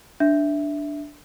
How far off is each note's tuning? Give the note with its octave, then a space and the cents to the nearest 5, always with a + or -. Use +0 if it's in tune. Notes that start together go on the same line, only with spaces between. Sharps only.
D4 +0 E5 +0